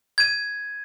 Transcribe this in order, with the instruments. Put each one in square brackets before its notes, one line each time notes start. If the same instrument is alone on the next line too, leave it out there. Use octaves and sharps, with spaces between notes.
[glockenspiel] G#6 D#7